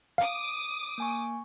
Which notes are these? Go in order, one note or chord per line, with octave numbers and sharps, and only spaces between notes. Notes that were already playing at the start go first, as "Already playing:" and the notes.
F5 D6 D#6
A#3 G#5 C#6